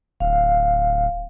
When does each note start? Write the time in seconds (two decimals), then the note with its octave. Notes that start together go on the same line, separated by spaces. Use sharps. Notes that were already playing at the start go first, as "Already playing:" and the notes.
0.20 D1 F5